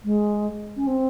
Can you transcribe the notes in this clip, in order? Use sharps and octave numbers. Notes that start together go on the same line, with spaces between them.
G#3
C#4
C4